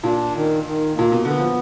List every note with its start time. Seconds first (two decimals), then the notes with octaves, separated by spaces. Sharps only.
0.04 A#2 D4
0.34 D#3
0.64 D#3
0.94 A#2 A#3
1.12 B2
1.25 D3 B3
1.39 F3